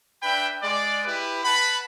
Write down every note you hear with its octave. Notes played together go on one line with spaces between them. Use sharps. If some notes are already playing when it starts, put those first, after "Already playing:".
D4 B4 E5 G5 B5
G#3 D5
E4 G4 B4
B4 F#5 A5 B5